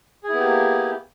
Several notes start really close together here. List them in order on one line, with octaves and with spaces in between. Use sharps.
G#4 E4 B3 G4 A#3